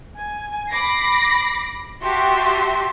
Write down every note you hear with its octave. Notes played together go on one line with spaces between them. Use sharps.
G#5
B5 D6 A#6 C7
F#4 G4 E5 A5 C6